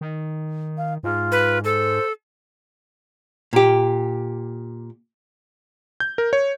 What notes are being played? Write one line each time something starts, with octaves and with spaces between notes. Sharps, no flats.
D#3
F5
G#2 F4
B4
A4 C5
A#2 G4
G6
A#4
C#5